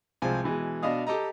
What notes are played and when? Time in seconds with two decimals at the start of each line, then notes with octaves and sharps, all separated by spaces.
0.22 C2 F3 G#3 C4 G#5
0.44 B2 E3 G#3
0.83 B2 D4 D#5 F5 D#6
1.07 G4 A4 D#5 A#5